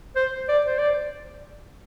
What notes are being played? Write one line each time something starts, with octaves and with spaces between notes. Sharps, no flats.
C5
D5
C5
D5